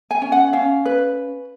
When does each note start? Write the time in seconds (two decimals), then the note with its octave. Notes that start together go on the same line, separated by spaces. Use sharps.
0.11 G#5
0.22 C#4
0.32 F#5
0.53 C#4 F5
0.85 B4